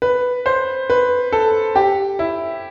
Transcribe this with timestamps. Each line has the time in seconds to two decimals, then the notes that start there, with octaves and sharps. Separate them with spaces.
0.02 B4
0.46 C5
0.90 B4
1.32 A4
1.76 G4
2.19 E4